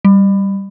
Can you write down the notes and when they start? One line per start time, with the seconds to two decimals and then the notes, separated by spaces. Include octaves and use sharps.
0.05 G3